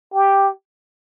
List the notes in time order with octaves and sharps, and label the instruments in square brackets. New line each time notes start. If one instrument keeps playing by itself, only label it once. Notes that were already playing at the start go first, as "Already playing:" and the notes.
[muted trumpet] G4